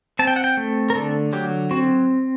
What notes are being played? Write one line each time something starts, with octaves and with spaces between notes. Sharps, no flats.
C4 A5
G5
F#5
G5
A3
A#4
D3 A4
F#3 G4
C4 F#4